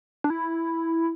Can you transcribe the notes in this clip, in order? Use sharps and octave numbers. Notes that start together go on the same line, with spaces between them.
D4
E4